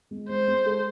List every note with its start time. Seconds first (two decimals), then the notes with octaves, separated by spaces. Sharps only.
0.11 G#3
0.29 G#3 C5
0.48 G#3
0.66 A4